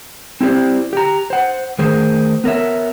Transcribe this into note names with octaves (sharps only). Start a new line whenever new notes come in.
C4 E4 G4 C5 D5
G4 A#5
C5 F#5
D#3 A3 G#4 A#4 C5
B3 A#4 C#5 E5